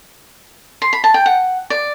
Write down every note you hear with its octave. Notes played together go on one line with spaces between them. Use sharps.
C6
B5
A5
G5
F#5
D5